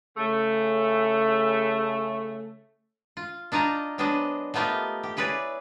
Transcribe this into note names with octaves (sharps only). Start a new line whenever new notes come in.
C#3 A3
F4
D4 D#4 F4 D#5 A#5
F#3 B3 D4 G#4 C5 D#5
A3 B3 D#4 F4 G4 A#4
G4
E4 G#4 B4 C#5 D5